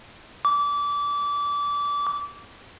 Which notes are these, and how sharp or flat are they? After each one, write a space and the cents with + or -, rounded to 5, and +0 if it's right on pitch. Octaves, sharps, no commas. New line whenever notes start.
D6 -25